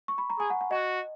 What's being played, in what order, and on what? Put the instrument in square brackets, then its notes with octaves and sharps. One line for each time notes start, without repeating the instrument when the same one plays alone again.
[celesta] C#6
B5
A#5
[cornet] G#4 [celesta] G#5
[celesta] F#5
F#5
[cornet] F#4 [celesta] D#5